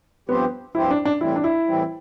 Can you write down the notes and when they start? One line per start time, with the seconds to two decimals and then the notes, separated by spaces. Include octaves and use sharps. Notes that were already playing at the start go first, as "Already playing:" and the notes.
0.29 G2 F3 B3 C4 G4 C5
0.75 G2 F3 C4 E4 G4 C5
0.91 D4
1.05 D4
1.20 A2 E3 G3 C4 E4
1.36 D4
1.44 E4
1.67 A2 E3 G3 C4